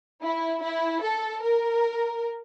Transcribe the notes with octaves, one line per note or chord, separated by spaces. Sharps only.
E4
E4
A4
A#4